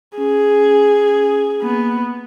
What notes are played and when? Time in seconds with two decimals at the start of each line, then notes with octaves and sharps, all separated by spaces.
0.18 C#4 G#4
1.62 A#3 B3